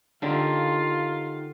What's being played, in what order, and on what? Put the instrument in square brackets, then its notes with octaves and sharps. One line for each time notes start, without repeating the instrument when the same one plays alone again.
[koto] D3 [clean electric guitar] D#4 G4 A#4 [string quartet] F4 F5